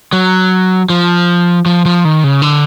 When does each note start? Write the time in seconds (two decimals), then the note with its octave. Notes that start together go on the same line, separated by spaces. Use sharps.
0.13 F#3
0.90 F3
1.66 F3
1.86 F3
2.05 D#3
2.24 C#3
2.42 D3